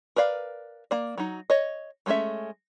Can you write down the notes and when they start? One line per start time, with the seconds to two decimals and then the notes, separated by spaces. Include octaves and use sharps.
0.16 A#4 B4 D5 F5
0.91 A#3 D5
1.18 F#3 D#4
1.50 C#5 D#5
2.06 F#3 G#3 A3 C#4 E5